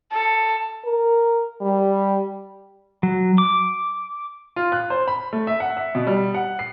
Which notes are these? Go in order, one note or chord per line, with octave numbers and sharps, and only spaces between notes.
A4
A#4
G3
F#3
D6
F4
F#6
C5
B5
A3
E5
F#5
E5
B2
G3
F#5
C7